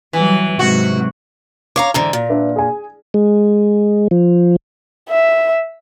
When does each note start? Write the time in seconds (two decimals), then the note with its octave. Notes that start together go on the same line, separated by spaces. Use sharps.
0.13 E3 F#3 G3
0.59 G#2 C3 F#3 F#4
1.76 C#5 F5 A#5 D6
1.94 G#2 D3 E3 A#5
2.13 A#2
2.29 D4 B4 E5
2.56 G#4 G#5
3.14 G#3
4.11 F3
5.09 E5